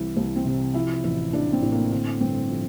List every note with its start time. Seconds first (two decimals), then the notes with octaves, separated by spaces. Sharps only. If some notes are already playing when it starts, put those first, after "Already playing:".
Already playing: C2 E3 E4
0.17 C2
0.36 C4
0.45 C3
0.74 F3 E4
1.04 A1 E4
1.33 A1 D4
1.53 C4
1.62 A2
1.72 A#3
1.91 D3 C4
2.21 G1 C4
2.50 F3